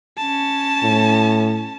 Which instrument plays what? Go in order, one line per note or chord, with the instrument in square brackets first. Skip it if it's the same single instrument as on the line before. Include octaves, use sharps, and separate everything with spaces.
[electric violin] C#4 A5
[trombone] A2